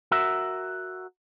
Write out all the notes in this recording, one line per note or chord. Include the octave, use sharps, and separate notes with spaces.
F#4 A#4 E5